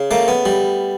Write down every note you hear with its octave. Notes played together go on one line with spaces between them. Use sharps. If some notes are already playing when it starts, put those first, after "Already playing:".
Already playing: C#3
A3 A#3
B3
G3